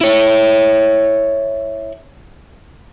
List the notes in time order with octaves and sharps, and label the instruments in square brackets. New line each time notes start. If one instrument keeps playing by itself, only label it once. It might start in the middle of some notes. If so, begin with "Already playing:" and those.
[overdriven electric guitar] E4 C#5